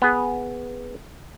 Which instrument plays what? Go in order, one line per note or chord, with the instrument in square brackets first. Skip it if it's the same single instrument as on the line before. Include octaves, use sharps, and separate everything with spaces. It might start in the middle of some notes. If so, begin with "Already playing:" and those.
[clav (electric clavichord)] B3 G#4